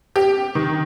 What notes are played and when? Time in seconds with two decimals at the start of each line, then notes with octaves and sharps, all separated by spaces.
0.16 G4
0.55 D#3